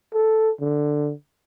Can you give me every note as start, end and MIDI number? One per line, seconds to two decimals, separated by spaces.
0.14 0.50 69
0.61 1.12 50